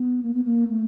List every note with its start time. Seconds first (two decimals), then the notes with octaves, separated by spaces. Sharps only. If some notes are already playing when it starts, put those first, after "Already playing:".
Already playing: B3
0.23 A#3
0.34 B3
0.45 A#3
0.69 A3